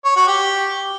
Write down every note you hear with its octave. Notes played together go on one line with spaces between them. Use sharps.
C#5
F#4
G4